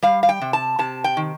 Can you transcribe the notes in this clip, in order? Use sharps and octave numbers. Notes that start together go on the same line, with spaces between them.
G3 F5
F5
G5
C3
A5
C3 A5
G5
D#3